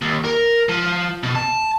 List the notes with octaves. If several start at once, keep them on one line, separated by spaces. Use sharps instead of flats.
D#2
A#4
F3
B2
A5